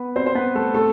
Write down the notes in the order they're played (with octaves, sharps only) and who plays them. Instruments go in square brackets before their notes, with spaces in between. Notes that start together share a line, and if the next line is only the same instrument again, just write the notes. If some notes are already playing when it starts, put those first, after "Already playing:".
Already playing: [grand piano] B3 B4
C4 C5
C5
B3 B4
A3 A4
A3 A4